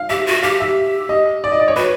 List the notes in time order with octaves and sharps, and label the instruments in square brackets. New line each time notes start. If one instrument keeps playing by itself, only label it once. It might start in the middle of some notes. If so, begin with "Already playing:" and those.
Already playing: [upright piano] F5
[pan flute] G4 [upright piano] E5
[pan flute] F#4
[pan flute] G4 [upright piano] F5
[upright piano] E5
D#5
D5
D#5
D5
C#5
[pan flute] F#4 [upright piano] B4